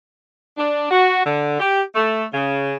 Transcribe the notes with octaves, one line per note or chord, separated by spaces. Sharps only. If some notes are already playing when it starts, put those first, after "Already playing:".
D4
F#4
D3
G4
A3
C#3